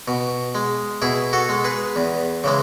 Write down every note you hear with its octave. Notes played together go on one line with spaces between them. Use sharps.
B2
G#3
B2 E4 G#4
F#4 A4
G#3
G#4 B4
E2
C#3 E3 G#3